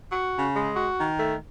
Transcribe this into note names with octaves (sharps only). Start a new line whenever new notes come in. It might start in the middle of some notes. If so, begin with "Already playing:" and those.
F#4
C#3
G#3
F#4
D#3
A3